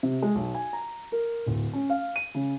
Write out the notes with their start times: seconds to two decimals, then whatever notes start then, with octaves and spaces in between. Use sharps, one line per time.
0.03 C3
0.22 G#3
0.35 B1
0.55 G#5
0.73 A#5
1.12 A#4
1.46 D1
1.73 C#4
1.90 F5
2.16 D#7
2.35 C#3